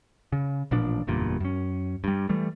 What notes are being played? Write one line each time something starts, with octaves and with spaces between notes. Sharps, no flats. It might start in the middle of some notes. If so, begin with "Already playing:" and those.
C#3
A1 A#2 F3 D4
F#1 E2 G2 A#2
F#2 C#4
G2 G3
E3 G3 A3